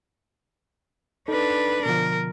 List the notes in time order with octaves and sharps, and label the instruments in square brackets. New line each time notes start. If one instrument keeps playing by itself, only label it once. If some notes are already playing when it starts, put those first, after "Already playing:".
[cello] D4 B4 [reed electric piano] D#4 A4
[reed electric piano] B2 D3 F3 [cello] A#4